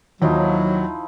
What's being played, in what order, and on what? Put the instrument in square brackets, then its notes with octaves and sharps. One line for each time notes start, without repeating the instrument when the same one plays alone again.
[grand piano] D#2 [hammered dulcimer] F3 D#4 E4 [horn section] F#3